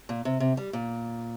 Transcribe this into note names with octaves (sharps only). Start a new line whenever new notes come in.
A#2
C3
C3
G3
A#2